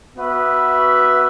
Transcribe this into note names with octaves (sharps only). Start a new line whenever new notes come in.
B3 F#4 B4 E5